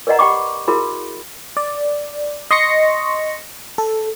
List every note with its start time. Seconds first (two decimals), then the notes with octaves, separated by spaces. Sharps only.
0.07 A#4 B4 D5 D#5 F#5 A#5
0.19 G4 F#5 G5 B5 C#6 D6
0.68 E4 F#4 G#4 A#4 B5
1.57 D5
2.51 D#5 C6 C#6 A#6 C#7
3.78 A4